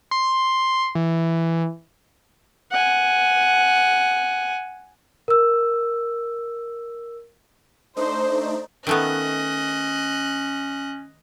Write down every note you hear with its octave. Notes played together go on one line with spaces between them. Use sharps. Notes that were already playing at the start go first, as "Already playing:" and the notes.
C6
E3
F#5 G#5
A#4 E6
A3 D4 D#4 C5
D#3 A3 B3 C#4 D#5 F#6